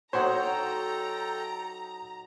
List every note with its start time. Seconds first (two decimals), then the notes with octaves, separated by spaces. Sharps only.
0.13 F#3 D#4 A4 C5 C#5 F#5 G5 A#5